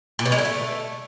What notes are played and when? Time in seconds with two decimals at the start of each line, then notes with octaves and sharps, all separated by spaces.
0.19 A#2
0.25 B2
0.32 G#3
0.38 D3
0.45 A3